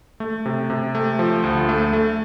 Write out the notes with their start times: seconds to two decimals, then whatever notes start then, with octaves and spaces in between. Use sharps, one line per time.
0.20 A3
0.45 C3
0.70 C3
0.95 A3
1.19 F3
1.44 D2
1.69 A3
1.93 A3